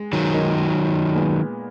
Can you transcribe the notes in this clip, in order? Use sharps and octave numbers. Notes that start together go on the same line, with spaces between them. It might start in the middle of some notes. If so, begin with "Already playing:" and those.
Already playing: G#3
D#3 F#3
G#3 D#4 A#4 C#5
A#2 G#3 B3